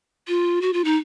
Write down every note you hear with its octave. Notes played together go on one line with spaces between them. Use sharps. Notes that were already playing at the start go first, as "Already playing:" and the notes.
F4
F#4
F4
D#4